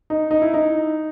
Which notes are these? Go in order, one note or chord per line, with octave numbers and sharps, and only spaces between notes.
D#4
D#4
E4
D#4